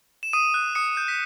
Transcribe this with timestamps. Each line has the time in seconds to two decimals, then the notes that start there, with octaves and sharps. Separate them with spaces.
0.23 E7
0.33 D#6 D#7
0.54 F#6
0.75 D#6 C#7
0.97 G6
1.08 B6